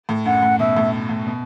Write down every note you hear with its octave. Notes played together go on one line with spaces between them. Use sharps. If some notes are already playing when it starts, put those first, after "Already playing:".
A2
F#2 F#5
A2
B2 E5
A2
A2
B2